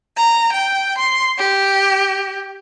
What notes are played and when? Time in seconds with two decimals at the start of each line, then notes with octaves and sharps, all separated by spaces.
0.16 A#5
0.53 G5
0.99 C6
1.38 G4